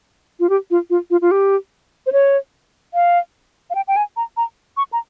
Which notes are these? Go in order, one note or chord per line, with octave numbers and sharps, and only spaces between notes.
F4
G4
F4
F4
F4
F4
G4
C5
C#5
F5
F5
G5
G5
G#5
A#5
A#5
C#6
A#5